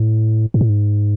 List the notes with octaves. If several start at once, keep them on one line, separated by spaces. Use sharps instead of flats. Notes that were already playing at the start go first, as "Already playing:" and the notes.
Already playing: A2
G#2
A2
G#2